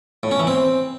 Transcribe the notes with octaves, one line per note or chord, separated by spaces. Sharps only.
A2
C#4
E3
C4